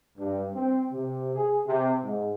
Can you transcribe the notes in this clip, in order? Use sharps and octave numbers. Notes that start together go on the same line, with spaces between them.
G2
C4
C3
G#4
C3
G#2